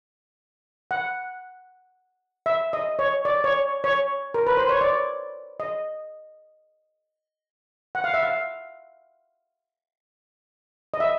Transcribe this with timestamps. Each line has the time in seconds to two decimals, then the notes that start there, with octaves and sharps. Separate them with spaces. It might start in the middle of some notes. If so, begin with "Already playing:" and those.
0.91 F#5
2.46 E5
2.73 D#5
2.99 C#5
3.25 D5
3.44 C#5
3.84 C#5
4.34 A#4
4.47 B4
4.57 C5
4.69 C#5
4.81 D5
5.60 D#5
7.95 F#5
8.04 F5
8.14 E5
8.23 F5
10.94 D#5
11.00 E5